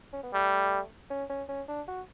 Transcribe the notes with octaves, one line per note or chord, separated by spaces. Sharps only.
C#4
B3
G3 A3
C#4
C#4
C#4
D4
F#4